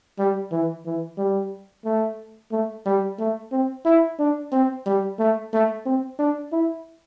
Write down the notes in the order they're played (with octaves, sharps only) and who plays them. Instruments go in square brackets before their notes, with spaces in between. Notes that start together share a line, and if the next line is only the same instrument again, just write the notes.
[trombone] G3
E3
E3
G3
A3
A3
G3
A3
C4
E4
D4
C4
G3
A3
A3
C4
D4
E4